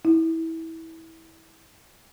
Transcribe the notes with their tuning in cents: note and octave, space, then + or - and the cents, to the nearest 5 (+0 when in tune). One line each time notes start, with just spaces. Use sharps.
E4 -20